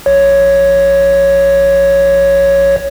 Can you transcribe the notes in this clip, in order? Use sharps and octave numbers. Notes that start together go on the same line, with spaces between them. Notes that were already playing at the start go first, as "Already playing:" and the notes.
A#1 C#5